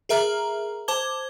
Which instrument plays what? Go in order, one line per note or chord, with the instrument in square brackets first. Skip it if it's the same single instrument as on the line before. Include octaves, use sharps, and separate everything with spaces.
[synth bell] G#4 A#4 E5 A#5 F6
C5 A5 D6 G#6 G7